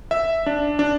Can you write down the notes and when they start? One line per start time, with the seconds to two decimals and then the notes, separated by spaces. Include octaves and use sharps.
0.11 E5
0.46 D4
0.79 D4